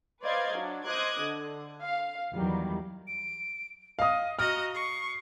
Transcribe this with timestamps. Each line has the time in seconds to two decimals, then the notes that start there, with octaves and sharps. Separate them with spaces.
0.22 B4 C5 D5 D#5 F5 G#6
0.53 F#3 D4
0.87 C5 D#5 D6 D#6 F#6 G#6
1.22 D3
1.83 F5
2.32 E2 D#3 F#3 G3
3.07 D7
3.99 D#5 F5 D#6
4.39 F#4 D#5 A#5 F6
4.75 C#6 C7